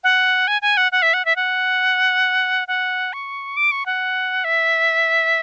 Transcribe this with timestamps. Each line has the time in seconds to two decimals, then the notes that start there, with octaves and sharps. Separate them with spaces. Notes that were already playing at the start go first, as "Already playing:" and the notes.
0.04 F#5
0.48 G#5
0.62 G#5
0.77 F#5
0.92 F#5
1.02 E5
1.14 F#5
1.25 E5
1.36 F#5
2.68 F#5
3.13 C#6
3.57 D6
3.72 C#6
3.86 F#5
4.44 E5